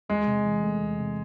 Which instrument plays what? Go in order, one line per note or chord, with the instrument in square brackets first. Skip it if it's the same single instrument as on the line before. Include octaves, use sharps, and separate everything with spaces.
[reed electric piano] E2 [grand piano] G#3
[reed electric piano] C3
E3
A3
E2
C3